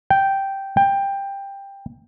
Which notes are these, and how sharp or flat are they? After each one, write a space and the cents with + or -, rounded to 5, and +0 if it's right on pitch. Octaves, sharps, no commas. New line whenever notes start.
G5 -5
G5 +15